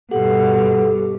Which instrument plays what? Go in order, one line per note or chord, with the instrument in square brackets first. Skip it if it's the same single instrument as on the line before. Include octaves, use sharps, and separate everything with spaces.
[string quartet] G2 B2 [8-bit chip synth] G4 [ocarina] A4 [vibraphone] F#5